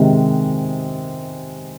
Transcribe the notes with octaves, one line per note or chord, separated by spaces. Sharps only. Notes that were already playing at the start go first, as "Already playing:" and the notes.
Already playing: C3 D#3 G#3